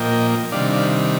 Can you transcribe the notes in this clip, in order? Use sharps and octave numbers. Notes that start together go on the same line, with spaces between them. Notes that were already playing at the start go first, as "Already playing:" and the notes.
Already playing: A#2 F3 A#3 D#5 G5
C3 D#3 G3 D4 D5 F5
D5 F5